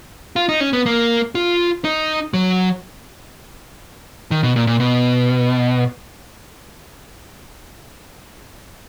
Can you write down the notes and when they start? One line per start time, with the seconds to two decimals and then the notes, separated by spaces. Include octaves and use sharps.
0.36 F4
0.49 D#4
0.60 C#4
0.73 B3
0.86 A#3
1.35 F4
1.84 D#4
2.34 F#3
4.31 D#3
4.43 B2
4.56 A#2
4.67 A#2
4.80 B2